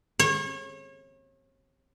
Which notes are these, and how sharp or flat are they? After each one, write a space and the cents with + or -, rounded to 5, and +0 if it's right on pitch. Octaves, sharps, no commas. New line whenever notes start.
C#5 -35